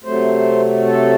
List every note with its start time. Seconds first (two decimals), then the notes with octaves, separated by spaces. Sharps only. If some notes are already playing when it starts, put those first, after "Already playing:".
0.04 C3 F#3 A3 C5
0.86 A4